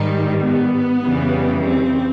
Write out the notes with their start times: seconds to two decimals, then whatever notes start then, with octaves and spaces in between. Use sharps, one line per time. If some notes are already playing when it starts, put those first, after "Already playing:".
Already playing: G#2 D#3 G3 D#4
0.42 B3
1.03 F2 C#3 E3 G3
1.64 C4